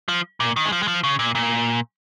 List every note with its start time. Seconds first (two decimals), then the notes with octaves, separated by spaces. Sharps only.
0.08 F3
0.40 A#2
0.56 D#3
0.66 G#3
0.72 F3
0.83 G#3
0.88 F3
1.04 C#3
1.19 A#2
1.35 A#2